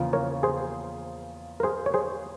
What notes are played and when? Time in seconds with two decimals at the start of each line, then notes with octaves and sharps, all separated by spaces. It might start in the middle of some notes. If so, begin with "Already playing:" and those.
Already playing: E2 C#3 F3 A#3 F4
0.13 A#4 C#5
0.43 G#4 C5
1.60 A#4
1.63 G#4 C5
1.86 C#5
1.94 G#4 C5